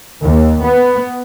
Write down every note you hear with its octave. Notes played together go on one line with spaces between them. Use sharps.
D#2
B3